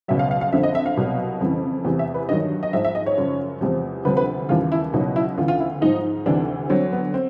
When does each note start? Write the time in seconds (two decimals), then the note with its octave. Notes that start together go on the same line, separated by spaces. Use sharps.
0.08 C#2 B2 F#3 E5
0.19 F5
0.31 F5
0.41 F5
0.52 F2 D3 F3 E5
0.63 D#5
0.75 E5
0.86 F5
0.97 C2 B2 F#3
1.41 F2 C#3 E3
1.85 E2 C3 E3
1.99 E5
2.14 B4
2.29 G2 D#3 F#3 D#5
2.63 D#5
2.73 G#2 F3 E5
2.85 E5
2.95 D#5
3.06 C#5
3.17 F#2 C#3 F3
3.61 E2 C3 F3
4.05 D2 C3 F3 B4
4.17 B4
4.49 D#2 C#3 E3 F4
4.72 E4
4.93 C#2 B2 F#3 D#4
5.16 E4
5.37 D2 C#3 E3 F4
5.48 F4
5.60 E4
5.81 G#2 F3 D#4
6.26 D2 C3 E3 D4
6.70 D2 D3 F#3 C4
6.92 B3
7.14 C4